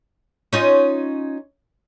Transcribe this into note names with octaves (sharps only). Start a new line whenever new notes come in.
C#4 D#4 F4